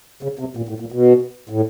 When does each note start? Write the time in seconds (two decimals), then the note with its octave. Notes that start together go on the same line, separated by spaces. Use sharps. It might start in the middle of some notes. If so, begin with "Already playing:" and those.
0.23 C#3
0.39 C3
0.57 A#2
0.69 A2
0.80 A#2
0.92 B2
1.49 A2